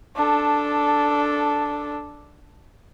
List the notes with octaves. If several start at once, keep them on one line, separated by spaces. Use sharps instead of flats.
D4 A4